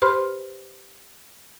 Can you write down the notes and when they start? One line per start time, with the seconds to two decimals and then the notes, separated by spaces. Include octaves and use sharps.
0.02 G4 B4 C5 B5 C6 F6